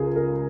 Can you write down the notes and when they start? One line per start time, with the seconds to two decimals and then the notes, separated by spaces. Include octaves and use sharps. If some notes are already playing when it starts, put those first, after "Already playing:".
Already playing: C#2 C#3 G#4 A#4
0.16 A#4